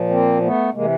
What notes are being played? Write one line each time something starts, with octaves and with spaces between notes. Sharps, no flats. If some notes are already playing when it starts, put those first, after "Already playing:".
Already playing: A#2 F3
A#3 C4
A3 B3
C3 E3 G#3 A#3